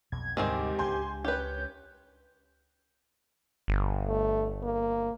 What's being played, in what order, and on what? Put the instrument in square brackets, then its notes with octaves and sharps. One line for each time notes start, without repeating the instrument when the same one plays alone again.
[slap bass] B1 F2 B2 [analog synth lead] G#6
[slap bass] D2 C3 G3 [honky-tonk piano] G#2 [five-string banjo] D#3 C4 G#4 [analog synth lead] G4
[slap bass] C#2 G#3 D4 [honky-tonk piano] G#5 C6 G6
[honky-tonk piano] C#4 [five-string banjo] G4 B4 [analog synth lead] G6
[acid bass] G1
[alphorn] A3
A#3